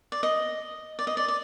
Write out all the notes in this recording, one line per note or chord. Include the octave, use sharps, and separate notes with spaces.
D5
D#5
D5
D#5
D5
D5